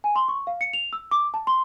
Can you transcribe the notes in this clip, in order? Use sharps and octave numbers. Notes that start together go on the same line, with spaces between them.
G#5
C6
C#6
F5
C#7
F7
E6
D6
A5
C6